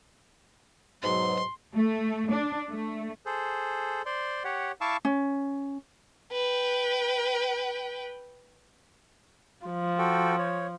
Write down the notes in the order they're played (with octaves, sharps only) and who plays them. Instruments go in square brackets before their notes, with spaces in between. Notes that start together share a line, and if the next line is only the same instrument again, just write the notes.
[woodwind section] G#2 B2 F#3 [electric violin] C6
[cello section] A3
D4
A3
[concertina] G#4 A4 C5
C5 D5 C6
G4 C#5 F#5
E4 F5 A5 C#6 D6 E6
[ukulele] C#4
[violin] B4 G5
[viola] F3
[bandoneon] F#4 A4 G5
C#5